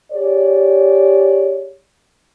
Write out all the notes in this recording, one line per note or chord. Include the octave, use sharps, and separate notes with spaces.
G4 G#4 C#5 D5